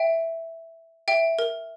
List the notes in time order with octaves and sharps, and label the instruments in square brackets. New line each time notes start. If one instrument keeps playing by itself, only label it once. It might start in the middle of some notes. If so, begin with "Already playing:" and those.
Already playing: [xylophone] E5 G5
E5 G5
A#4